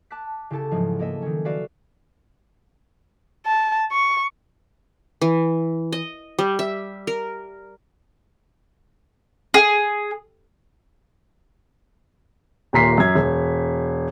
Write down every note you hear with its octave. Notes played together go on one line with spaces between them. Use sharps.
A5 D6 F#6 B6
C#3 E4 G4 A4 A5
E2 G#2 F3 F#3 G#3
A#3 A4 D#5 E5
D#3 C#4
F#4 B4 D5 E5 F5
A5
C#6
E3
D#5
G3
E5
A#4
G#4
D#1 A#2 A#5 B6 C7
F#2 G#6
E1